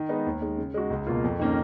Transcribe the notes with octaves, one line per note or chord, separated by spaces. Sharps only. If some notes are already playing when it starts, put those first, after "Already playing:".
Already playing: D#3
G#3 B3 D#4
D#2
D#3 G#3
C#3
G#3 D#4 F#4
C#2
B2 A#3 F4
F2
D#3 A#3 C#4